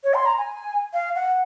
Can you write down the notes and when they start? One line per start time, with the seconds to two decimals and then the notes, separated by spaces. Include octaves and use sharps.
0.04 C#5
0.14 C6
0.26 A#5
0.38 G#5
0.93 F5
1.15 F#5